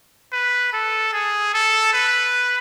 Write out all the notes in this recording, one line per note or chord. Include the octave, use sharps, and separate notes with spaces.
B4
A4
G#4
A4
B4